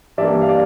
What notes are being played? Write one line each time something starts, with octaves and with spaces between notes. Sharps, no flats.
G2 E3 G3 A#3 D5 E5
F5
D5 E5